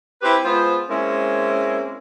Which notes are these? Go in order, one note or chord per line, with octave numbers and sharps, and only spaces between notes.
C4 E4 G4 B4 C5
G#3 B3 F4 C5
G#3 A#3 C4 C#4 E4